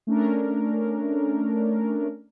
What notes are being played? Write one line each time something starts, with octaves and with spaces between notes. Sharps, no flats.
A3 C#4 D4 A#4